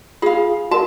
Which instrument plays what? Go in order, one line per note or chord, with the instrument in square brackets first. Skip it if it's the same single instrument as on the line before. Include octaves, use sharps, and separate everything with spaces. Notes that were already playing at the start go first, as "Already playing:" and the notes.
[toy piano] F4 [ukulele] G#4 F5
[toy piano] F#4 A#4 [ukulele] A5